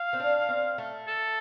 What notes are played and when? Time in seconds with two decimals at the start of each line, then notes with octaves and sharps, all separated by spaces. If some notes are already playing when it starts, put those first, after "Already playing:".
Already playing: F5
0.13 C4
0.20 D4
0.49 C4
0.78 A3
1.08 A4